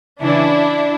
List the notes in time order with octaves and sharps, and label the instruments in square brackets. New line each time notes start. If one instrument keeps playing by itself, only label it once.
[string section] C#3 E3 D4 E4